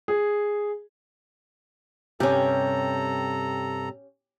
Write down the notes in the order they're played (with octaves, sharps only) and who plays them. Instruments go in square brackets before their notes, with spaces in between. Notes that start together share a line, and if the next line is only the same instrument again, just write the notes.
[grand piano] G#4
[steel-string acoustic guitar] G2 C3 [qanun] C#4 G4 [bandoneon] A4 A#5